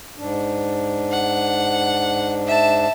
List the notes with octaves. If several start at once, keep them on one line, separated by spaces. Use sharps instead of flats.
G#2 D4
F#5
E5 A5